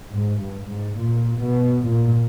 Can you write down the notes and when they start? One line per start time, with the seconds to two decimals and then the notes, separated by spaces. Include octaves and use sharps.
0.13 G#2
0.41 G2
0.70 G#2
0.99 A#2
1.43 B2
1.87 A#2